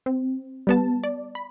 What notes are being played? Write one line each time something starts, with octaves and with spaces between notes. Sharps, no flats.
C4
G3 B3 A5
D5
B5